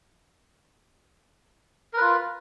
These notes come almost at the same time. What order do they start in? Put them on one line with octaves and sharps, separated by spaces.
A#4 B4 F4